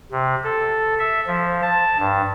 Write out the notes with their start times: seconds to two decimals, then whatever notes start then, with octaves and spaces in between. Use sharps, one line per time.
0.11 C3
0.44 A4
0.99 E5
1.27 F3
1.62 A5
1.99 G2